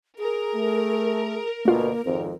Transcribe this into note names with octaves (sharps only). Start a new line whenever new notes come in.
G#4 A#4
A3
D2 B2 A3 A#3 F4
G#1 F2 C4